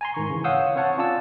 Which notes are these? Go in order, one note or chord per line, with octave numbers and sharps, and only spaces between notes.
G#5 A#5 C6
G#2 D#3 C#6
C#3 E3
C#5 F5 F#5 D#6 E6 G6
C4 C5 C#5 F#5 A5
C#4 F4 D5 A5 E6